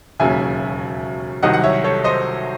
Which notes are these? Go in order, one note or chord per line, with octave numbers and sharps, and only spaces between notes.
E1 D#2 C#3 F#3 E5 G#5
C2 C3 D#3 F#3 D#5 F#5
F#5
C#5 E5
A4 C#5
C5 D#5